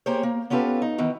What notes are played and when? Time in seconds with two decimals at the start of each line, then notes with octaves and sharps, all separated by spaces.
0.06 A#3 G4 G#4 C5 C#5
0.23 A#3
0.50 B3 C#4 F4 G4 A4 B4
0.82 D#4
0.98 D#3 E3 B3